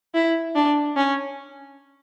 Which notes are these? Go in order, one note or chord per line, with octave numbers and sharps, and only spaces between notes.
E4
D4
C#4